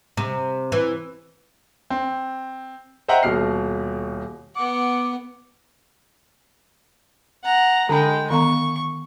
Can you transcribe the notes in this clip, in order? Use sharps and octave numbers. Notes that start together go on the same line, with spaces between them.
C3
E3
C4
C5 D#5 E5 F#5 G5 A#5
D#1 B2 F6 C7
B3 F#5 D6
F#5 A#5
D3 G#3 D4 G5 B5
D#3 B3 A#5 C#6